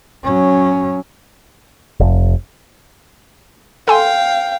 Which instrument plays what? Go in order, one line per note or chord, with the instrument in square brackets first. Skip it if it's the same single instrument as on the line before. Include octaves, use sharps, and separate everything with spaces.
[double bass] F#3 C#4
[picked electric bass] F1
[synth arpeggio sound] A4 G#5 C6 [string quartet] F5 G5